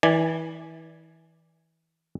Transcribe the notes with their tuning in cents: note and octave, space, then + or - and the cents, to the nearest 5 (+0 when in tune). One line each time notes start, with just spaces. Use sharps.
E3 -25 D5 +0 G#5 +0